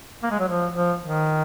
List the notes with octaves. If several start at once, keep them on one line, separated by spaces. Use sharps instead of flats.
A#3
G#3
F#3
F3
F3
D#3